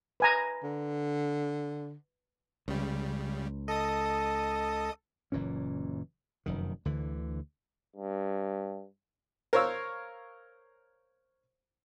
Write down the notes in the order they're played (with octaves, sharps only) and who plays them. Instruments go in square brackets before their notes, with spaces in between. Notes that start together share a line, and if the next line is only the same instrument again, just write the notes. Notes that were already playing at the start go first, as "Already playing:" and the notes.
[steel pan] B4 G#5 A#5
[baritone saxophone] D3
[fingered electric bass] C#2 [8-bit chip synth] C#3 G3
[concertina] A4 [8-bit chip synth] D#5 D#6
[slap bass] F#1 A#2 E3 C#4
F1 F#2 D#3
D2 D3 E3
[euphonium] G2
[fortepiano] A#4 C5 C#5 F5 E6